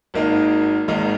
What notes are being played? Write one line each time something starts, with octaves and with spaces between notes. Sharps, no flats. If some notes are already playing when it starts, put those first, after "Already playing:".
G#1 G#2 D#3 A#3 D#4
G#1 G#2 D#3 A#3 D#4